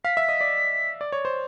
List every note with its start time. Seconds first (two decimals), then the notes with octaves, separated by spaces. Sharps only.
0.05 F5 B6
0.17 E5
0.29 D#5
0.41 D5
1.01 D5
1.12 C#5
1.25 C5